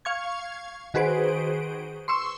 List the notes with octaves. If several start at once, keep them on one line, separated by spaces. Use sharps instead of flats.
F5 C#6 G#6
D#3 F#4 G#4 B4 C5 D7
C6 C#6 E6